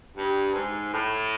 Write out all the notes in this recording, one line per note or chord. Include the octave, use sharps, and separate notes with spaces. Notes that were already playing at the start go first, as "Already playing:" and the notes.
G2
G#2
A2